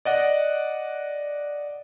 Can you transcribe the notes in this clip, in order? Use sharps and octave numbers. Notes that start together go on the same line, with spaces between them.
D5 D#5 F#5